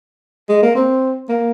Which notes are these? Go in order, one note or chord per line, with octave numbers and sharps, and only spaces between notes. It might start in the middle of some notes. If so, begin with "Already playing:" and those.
G#3
A#3
C4
A#3